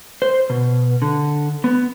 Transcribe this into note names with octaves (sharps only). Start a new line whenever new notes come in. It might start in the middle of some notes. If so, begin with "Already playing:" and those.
C5
B2
D3
B3